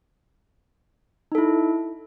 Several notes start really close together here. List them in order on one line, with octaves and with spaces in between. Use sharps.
D#4 A4 E4